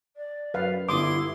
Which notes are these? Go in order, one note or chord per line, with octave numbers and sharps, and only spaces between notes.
D5
F#2 B4 F5
G1 E4 C6 D6 D#6